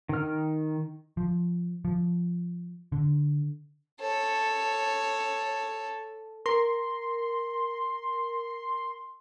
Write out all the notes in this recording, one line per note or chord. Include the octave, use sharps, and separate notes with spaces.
D#3 F6
F3
F3
D3
A4 C#5
A#4 C6